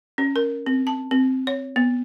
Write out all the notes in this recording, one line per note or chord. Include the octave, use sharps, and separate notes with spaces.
C#4
A#4
C4
A5
C4
C#5
B3